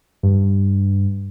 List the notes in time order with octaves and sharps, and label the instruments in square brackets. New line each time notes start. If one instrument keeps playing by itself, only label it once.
[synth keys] G2